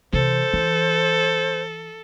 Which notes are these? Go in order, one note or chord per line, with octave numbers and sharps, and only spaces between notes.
C3 E3 A4 C5
E3